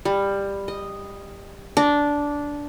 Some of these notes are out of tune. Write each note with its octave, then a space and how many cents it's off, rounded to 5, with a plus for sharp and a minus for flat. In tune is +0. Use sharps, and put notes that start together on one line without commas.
G3 +15
D#5 -5
D4 -10